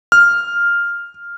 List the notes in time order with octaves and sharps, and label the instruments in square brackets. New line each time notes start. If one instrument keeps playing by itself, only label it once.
[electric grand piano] F6